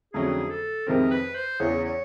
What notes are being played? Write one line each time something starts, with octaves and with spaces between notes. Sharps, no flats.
F2 D3 F#3 A3 C#4 G#4
A4
F2 C3 D#3 G#3 C4 A#4
B4
C5
E2 C#3 E3 C#5
C#5